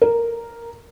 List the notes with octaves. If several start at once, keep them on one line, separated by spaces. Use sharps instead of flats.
A#4